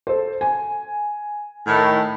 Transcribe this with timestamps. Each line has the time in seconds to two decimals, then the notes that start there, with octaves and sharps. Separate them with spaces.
0.07 A4 C5
0.41 G#5
1.67 A2 D#3